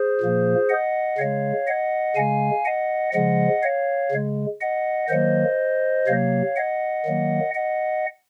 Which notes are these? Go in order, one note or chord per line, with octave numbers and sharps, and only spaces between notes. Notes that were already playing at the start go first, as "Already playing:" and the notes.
Already playing: G#4 C5
A#2 F3 A#3
D#5 F#5
C#3 G#3 C#5 F5
D#5 F#5
C#3 G#3 F5 G#5
D#5 F#5
C#3 F3 G#3 D#5 F#5
C#5 F5
C#3 G#3
D#5 F#5
D#3 F#3 A#3 C5 D#5
C3 F#3 A#3 C#5 F5
D#5 F#5
D#3 F#3 A#3
D#5 F#5